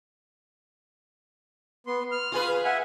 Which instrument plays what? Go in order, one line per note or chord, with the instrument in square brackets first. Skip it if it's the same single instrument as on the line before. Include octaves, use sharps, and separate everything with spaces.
[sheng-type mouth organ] B3 C6
F6
[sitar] F4 G#4 B4
[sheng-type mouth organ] E5 F#5 G#5